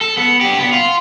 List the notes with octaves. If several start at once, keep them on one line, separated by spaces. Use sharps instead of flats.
A4
B3
D4 G4
B3
F4